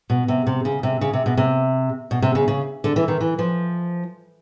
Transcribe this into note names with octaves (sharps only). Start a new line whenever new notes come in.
B2
C3
C3
C#3
C3
C#3
C3
B2
C3
B2
C3
C#3
C#3
D3
E3
D#3
E3
F3